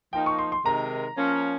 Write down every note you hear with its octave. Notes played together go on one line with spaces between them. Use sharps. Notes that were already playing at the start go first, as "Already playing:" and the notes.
F3 A#3 D#4 G5
C#6
C6
C6
C3 D#3 G#3 D#4 A#4 A#5
F3 A#3 C#4